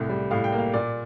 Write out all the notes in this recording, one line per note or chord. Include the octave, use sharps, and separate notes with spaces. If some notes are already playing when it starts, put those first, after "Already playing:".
Already playing: C2 A2
G3
A2 F5
G5
A#3
F5
A#2 D5